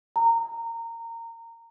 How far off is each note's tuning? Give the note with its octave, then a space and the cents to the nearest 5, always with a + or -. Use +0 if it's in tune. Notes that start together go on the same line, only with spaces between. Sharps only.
A#5 -20